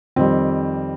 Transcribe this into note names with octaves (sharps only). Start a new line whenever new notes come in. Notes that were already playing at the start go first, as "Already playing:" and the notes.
F2 D#3 G3 C4